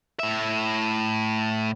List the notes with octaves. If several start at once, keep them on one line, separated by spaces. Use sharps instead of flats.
A2 E5